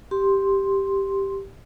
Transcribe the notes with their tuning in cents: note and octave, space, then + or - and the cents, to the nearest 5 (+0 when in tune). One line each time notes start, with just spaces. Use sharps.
G4 +0 C6 +0